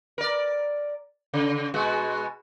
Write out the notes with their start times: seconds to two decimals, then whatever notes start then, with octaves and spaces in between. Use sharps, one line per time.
0.18 A#4 D5
1.34 C#3
1.74 B2 G#3 F#4